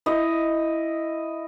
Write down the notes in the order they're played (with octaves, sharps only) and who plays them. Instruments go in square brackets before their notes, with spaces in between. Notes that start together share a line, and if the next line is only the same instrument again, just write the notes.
[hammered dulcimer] E4 D#5